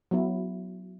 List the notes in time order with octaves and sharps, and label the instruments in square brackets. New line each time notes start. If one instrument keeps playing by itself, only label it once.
[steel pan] F#3 B3 E4